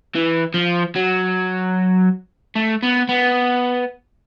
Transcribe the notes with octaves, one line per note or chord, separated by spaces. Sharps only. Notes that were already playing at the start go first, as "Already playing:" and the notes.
E3
F3
F#3
A3
B3
B3